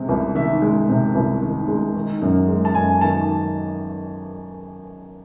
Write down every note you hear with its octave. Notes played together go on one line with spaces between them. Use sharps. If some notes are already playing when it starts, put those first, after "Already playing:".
Already playing: C3 G#3
C2
D#3 E5
G#3
C3
C2
D#3
G#3
D#3
F#2
G#3
A5
F#2 G#5
D#3 A5